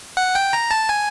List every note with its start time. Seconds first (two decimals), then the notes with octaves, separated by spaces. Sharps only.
0.17 F#5
0.35 G5
0.53 A#5
0.71 A5
0.89 G#5